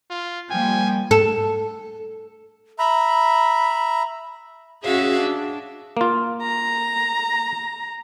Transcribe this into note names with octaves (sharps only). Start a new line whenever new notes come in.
F4
F3 G3 A#3 G5 G#5
A4
E5 A#5 B5
C#4 F#4 G#4 E5 F5
D4
A#3 F4
A#5